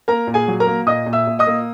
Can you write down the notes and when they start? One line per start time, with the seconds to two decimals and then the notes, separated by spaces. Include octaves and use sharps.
0.08 A#3 A#4 A#5
0.27 A#2
0.34 G#4 G#5
0.48 F#3
0.60 A#4 A#5
0.67 A#3
0.86 A#2 D#5 D#6
1.06 A#2
1.13 E5 E6
1.27 A#2
1.39 D#5 D#6
1.47 A#3